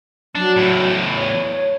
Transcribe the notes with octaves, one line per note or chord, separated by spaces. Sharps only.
F#3 D4
E2 A2
C#5